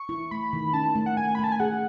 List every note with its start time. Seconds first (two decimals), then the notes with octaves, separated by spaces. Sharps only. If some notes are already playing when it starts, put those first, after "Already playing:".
Already playing: C#6
0.09 E4
0.31 A3 B5
0.53 D#3
0.73 C#4 A5
0.95 A3
1.06 F#5
1.17 A3 G#5
1.35 B5
1.39 A3 A5
1.52 G#5
1.60 G#4 F#5